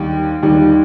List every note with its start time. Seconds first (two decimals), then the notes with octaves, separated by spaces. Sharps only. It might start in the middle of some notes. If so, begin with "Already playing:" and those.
Already playing: D#2 D#3 G3
0.42 D#2 D#3 G3